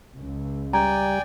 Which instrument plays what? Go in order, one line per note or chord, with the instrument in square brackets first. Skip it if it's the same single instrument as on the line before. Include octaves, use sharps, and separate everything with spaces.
[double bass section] C#2
[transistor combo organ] G3 [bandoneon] D5 G5 G#5 [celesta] A#5